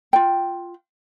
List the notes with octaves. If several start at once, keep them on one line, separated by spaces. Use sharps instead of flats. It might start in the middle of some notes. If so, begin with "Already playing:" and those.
F4 G5